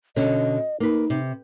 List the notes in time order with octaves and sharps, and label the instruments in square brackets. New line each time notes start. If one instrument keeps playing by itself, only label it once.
[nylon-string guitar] B2 D3 C#4 [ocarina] D#5
[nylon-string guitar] A#3 B4 [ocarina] D#4
[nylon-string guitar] C3